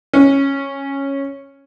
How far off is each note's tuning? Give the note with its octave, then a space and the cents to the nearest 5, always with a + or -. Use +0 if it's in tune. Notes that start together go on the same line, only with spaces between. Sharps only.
C#4 -10